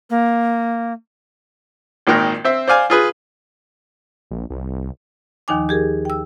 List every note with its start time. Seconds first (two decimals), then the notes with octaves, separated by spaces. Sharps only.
0.10 A#3
2.07 G#1 A#2 D#3 A#4 G5 F#6
2.44 C4 C5 E5
2.68 C5 D5 F5 G#5
2.90 F4 G#4 B4
4.31 A#1
4.50 C2
5.48 D#2 D#3 F3 D#4 G#5 D6
5.69 G4 G#4 A#4
6.05 G5 E6